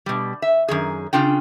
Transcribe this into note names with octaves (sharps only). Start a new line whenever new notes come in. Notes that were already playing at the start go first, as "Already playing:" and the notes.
B2 G3
E5
F#2 D#3 G#4
C#3 D4 F4 G5